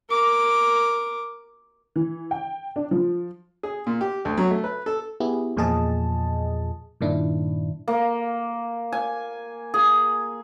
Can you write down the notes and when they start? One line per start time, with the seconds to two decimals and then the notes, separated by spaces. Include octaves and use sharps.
0.10 A#4 D6
1.96 E3
2.31 G5
2.76 D4
2.91 F3
3.63 G#4
3.87 A#2
4.01 G4
4.25 D2
4.37 F#3
4.51 A3
4.64 B4
4.86 A4
5.20 B3 E4 G4 G#4
5.57 E2 A#2 F3 G#4 D#5 A5
7.01 G2 A#2 D#3 D4 E4
7.88 A#3
8.92 G#5
9.74 G#4